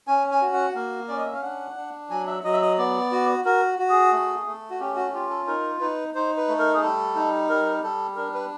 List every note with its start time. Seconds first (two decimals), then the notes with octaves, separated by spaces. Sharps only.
0.07 C#4 G#5
0.31 G#5
0.42 F#4
0.53 F#5
0.75 A#3 F5
1.08 C#4 D5
1.17 D#5
1.26 E5
1.34 F5
1.42 D4 F#5
1.76 D4
2.10 F#3 G#5
2.27 E5
2.44 F#3 D#5
2.53 E5
2.61 D#5
2.78 B3 D5
3.12 F#4
3.45 F#4 A#4
3.79 F#4
3.90 G#4
4.12 A3
4.46 A3
4.70 F#4
4.80 C#4 G4
4.96 F#4
5.13 F4 G4
5.30 A4
5.47 D#4 A#4
5.80 D#4 B4
6.14 D#4 C5
6.37 B4
6.48 A3
6.59 A#4
6.74 G#4
6.82 G3 A4
7.15 D#4
7.49 G3 A#4
7.83 G3 A4
8.16 D4 A#4
8.34 B4